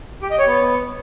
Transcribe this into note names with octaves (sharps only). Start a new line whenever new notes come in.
G4
D#5
C#5
B3